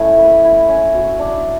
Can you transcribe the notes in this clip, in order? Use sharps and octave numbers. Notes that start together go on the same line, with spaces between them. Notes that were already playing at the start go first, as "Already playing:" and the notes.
Already playing: A3 C#4 E4
B4
E4
C#4
F#4
D4